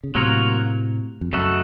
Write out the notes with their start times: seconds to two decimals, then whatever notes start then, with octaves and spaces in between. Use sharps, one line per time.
0.04 C#3
0.15 A2 C3 F#3 A#3 F4 A#4 C#5
1.21 F2
1.33 F#2 C#3 A3 D#4 F#4 A4